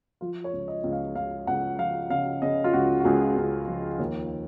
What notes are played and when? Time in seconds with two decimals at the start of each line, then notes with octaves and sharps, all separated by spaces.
0.21 F3 F4
0.44 C#5
0.53 C#2
0.68 D#5
0.84 C#2
0.92 F5
1.15 C#2 F5
1.47 C#2 F#5
1.78 F3 F5
2.10 C#3 F5
2.42 C#3 D#5
2.64 F4
2.73 C#2 F#4
3.00 F#4
3.05 C#2 G#4
3.37 C#2
3.68 F3
3.99 D#2